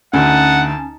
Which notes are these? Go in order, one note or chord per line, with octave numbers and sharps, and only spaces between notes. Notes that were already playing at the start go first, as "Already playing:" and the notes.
D2 D3 C#4 D#4 F#5 A5